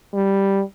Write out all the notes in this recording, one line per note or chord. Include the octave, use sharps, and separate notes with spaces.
G3